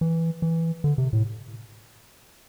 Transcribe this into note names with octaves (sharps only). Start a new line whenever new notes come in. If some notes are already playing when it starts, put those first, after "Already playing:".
E3
E3
D3
C3
A2